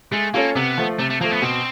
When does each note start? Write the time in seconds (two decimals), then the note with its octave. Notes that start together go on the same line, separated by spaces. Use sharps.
0.11 G#3 A3
0.34 A#3 C#4 F4 A4 C#5
0.55 C3 B3
0.78 F3 A3
0.99 C3 A3
1.10 A3
1.21 F3 A3 A#3
1.31 B3
1.42 B2 C4